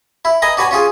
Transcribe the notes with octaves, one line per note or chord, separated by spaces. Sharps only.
E4
B4 D#5 G#5 A#5
D4 F#4 B4 C#5 G#5
C#4 F4 G#4 G#5